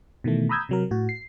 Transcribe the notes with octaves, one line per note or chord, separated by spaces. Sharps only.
B2 D#3 E3 A3
A#5 B5 D#6 E6 G6 G#6
C3 F#3 A#4
A2 F#4
C7